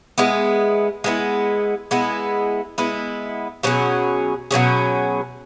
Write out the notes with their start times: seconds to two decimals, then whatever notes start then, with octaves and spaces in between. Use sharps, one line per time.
0.18 G#3 B3 E4
1.04 G#3 B3 E4
1.91 G#3 B3 E4
2.78 G#3 B3 E4
3.63 B2 F#3 C#4 G#4
4.51 B2 F#3 C#4 G#4